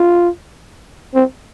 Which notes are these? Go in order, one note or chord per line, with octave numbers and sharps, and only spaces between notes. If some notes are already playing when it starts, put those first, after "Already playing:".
Already playing: F4
C4